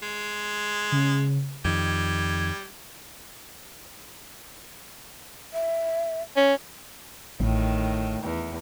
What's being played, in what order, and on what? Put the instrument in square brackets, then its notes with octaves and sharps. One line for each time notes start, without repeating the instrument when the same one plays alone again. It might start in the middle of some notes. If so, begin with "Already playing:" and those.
[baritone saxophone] G#3
[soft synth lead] C#3
[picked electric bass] F2 D#3 [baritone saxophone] G3 [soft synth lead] G#6
[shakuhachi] E5
[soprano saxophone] C#4
[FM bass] A1 [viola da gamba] A2 D#3
[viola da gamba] E2